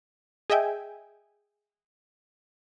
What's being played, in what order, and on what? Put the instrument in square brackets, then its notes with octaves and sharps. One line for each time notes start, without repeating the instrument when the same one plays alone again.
[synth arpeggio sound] G#4 D#5 E5 G5 G#5